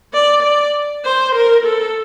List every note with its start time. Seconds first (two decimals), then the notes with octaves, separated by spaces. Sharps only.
0.13 D5
0.43 D5
1.05 C5
1.35 A#4
1.65 A4